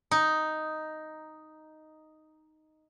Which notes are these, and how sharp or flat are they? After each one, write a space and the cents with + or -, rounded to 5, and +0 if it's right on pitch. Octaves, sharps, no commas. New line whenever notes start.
D#4 +0